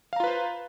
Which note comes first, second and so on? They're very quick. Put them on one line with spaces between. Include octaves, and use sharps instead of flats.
F5 A#5 F4 B4 C5